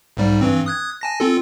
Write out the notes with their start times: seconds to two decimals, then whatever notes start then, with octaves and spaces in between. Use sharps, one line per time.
0.17 B1 G#2 G3
0.41 G2 E3 C4
0.66 D#6 F#6 G#6
1.01 G#5 A5 A#6
1.20 C4 F4 A4